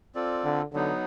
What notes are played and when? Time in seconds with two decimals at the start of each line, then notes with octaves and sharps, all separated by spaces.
0.15 C4 F4 A4 D5
0.44 D3
0.73 D3 F#3 B3 D#4